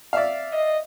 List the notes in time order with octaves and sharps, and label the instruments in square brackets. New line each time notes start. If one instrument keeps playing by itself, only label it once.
[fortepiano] D5 E5 F5
[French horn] D#5